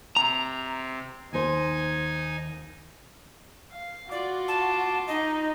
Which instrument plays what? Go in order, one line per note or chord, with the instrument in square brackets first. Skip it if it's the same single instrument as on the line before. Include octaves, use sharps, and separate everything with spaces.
[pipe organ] C3 [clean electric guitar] A#5
[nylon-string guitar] D#2 C5 [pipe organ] D#4 G#5
[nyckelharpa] F5
[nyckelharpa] F4 D6 [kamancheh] F#4 [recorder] D5
[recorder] A5
[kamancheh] D#4 [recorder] D#5